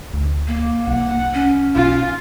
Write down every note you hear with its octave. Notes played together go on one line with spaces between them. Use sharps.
D2
A#3
C2 F#5
C#4
B1 F4